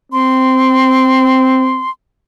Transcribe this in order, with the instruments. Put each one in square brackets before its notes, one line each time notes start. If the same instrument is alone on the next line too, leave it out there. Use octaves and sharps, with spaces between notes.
[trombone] C4 [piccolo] C6